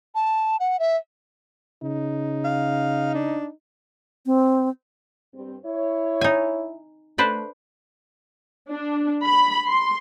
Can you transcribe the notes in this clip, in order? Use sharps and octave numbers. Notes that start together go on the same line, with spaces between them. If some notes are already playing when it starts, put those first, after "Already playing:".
A5
F#5
E5
C#3 D#4
F5
D4
C4
G2 G3 C4
E4 C#5
D#4 G#5
A3 D4 B4 C5
D4
B5
C6